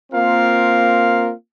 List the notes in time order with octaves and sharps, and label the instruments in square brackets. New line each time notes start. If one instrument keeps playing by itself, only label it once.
[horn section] A#3 C4 F4 A#4 F5